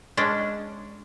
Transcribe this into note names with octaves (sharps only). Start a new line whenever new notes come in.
G#3 C#4 D4